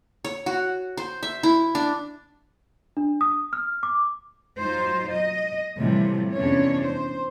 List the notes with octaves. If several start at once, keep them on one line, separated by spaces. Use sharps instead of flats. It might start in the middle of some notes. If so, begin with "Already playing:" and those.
C#5
F#4
C5
E5
E4
D4
D4
D#6
F6
D6
F#3 D#4 F4 C5
D#5
A2 C3 E3 F3 G3
E2 C3 C#4 D4 C#5
C5